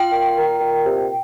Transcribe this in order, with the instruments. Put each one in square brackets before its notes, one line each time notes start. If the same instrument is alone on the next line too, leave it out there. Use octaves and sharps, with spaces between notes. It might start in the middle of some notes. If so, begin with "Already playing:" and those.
Already playing: [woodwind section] F4 [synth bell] G5
[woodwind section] A#2
A#4
A#2
C3